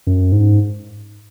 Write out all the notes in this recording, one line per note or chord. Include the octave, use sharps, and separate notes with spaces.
F#2
G#2